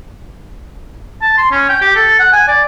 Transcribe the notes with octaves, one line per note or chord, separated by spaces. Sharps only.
A5
C6
C#4
G5
G4
A4
F#5
G#5
D5